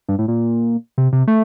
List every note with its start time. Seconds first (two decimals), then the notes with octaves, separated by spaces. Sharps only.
0.09 G2
0.19 A2
0.28 A#2
0.98 C3
1.13 C3
1.27 A3